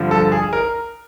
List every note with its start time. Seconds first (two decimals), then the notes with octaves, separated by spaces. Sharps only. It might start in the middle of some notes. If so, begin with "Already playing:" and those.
Already playing: G2 D3 F3
0.11 A4
0.32 G#4
0.53 A#4